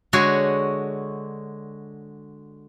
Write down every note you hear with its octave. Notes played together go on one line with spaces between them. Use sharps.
D3 G#3 F#4 C#5